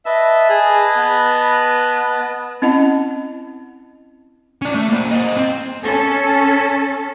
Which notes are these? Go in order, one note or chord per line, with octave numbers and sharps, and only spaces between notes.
B4 D#5 E5 A5
G#4
B3
C4 C#4 E4 D#5 F#5 A5
C#4 D5
A3
A#3 C5
C5 D#5
C4
C#4 A4